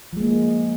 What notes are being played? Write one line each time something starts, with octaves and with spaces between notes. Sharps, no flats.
F3 G#3 A#3